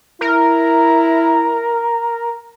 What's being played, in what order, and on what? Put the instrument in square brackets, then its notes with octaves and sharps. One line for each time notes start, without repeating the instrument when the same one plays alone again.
[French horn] E4 [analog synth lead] A#4